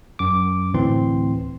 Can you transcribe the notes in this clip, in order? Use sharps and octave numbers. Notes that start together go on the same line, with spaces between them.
F#2 D6
D2 A2 E3 C4 C6